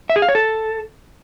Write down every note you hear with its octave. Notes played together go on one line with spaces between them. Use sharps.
E5
G#4
F5
C#5
A4